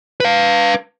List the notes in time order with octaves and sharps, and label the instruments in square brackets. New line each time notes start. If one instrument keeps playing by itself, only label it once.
[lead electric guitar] B4 F5